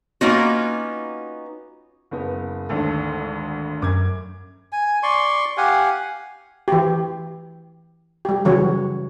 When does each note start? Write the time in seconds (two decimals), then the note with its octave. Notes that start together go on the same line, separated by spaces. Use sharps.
0.21 A#3 B3 C#4 D#4 F4 F#4
2.11 F#1 B3
2.69 G#1 D2 A4
3.82 F#2 D6 G#6
4.72 G#5
5.03 D5 C6 C#6
5.57 G4 F5 F#5 G#5
6.68 E3 G4
8.25 G3 G4
8.45 C#3 E3 F#3 G3 F#4 C#5